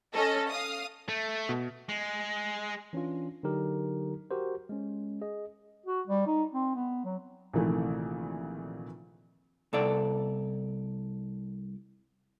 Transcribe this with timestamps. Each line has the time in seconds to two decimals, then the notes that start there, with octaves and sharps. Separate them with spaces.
0.14 C#4 A4 D#5
0.49 F5 D#6
1.09 A3
1.49 B2
1.89 G#3
2.93 E3 C#4 D4 F4
3.43 D3 F#3 D#4 G4 A#4
4.31 F#4 G4 A#4 C5
4.69 G#3 C#4
5.21 G#4 D#5
5.86 F#4
6.07 G3
6.27 D#4
6.54 C4
6.75 B3
7.05 F#3
7.53 A#1 C3 D#3 E3 A3
9.73 C2 A4 D5